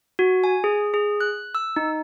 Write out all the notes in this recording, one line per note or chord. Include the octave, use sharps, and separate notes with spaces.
F#4
G#5
G#4
G#4
F#6
E6
D#4